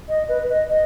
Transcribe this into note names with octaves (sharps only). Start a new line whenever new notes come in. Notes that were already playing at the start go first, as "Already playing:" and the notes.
D#5
B4
D#5
D#5